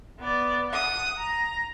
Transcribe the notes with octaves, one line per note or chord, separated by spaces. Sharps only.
B3 D5
F#5 D#6
A#5